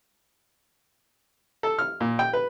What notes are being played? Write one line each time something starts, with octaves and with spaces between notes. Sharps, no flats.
A4
F6
A#2
G5
B4